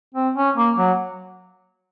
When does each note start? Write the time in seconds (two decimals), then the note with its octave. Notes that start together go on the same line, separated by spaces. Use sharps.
0.14 C4
0.36 C#4
0.56 A#3
0.77 F#3